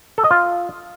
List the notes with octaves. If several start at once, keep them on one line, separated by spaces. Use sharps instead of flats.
A4
D#5
F4